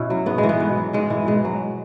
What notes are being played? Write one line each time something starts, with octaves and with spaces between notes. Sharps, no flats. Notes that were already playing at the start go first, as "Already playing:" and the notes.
Already playing: B2 C#4 E4
F#3
G#2 B3
G#3
E3
B3
B2
F#3
G#2 G#3
E3
B2 G#3
F#3